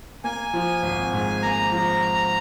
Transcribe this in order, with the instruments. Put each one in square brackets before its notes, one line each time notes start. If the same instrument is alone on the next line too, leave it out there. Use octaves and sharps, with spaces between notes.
[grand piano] A#3 [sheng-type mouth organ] G#5
[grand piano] F3
G#1
G#2
[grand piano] A#3 [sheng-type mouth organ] A#5
[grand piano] F3